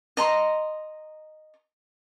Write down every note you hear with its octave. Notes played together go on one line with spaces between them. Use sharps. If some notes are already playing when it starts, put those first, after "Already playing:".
D#5 A#5 C6